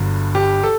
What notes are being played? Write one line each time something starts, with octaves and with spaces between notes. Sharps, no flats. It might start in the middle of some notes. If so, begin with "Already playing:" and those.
Already playing: G1 G2 D3 F#3
G4
A4